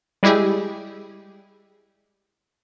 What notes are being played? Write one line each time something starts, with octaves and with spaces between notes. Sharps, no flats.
G3 G#3 E4 G4 G#4